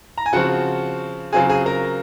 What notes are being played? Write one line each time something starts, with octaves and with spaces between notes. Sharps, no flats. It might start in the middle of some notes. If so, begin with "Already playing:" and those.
A#5
G#5
C#3 F3 C4 F#4 F#5
C#3 F#3 C4 F4 G#4 G#5
G#4 G#5
A#4 A#5